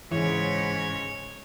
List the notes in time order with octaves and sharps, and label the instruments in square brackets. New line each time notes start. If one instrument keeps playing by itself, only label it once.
[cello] G#2 C#3 [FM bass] E3 [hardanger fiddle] C#5